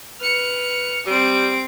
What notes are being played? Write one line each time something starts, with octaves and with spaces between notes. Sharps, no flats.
B4 F6 C#7
G3 C4 D7